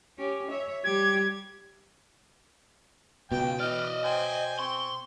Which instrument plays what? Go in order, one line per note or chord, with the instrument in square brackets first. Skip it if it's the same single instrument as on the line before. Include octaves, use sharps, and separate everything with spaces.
[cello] C#4 G4
C#5 E5
[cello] G3 G4 [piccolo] G#6
[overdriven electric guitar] C#2 [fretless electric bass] B2 [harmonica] G5
[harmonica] E3 F6 [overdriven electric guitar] D5 D#5
[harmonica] C5 G5 G#5
[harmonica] C4 C#6 [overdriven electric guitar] C6